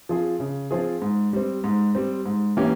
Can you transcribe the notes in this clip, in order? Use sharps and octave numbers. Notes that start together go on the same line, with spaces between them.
F3 C4 F4 G#4
C#3
F3 C4 F4 G#4
G#2
G3 C4
G#2
G3 C4
G#2
E3 A#3 C#4 G4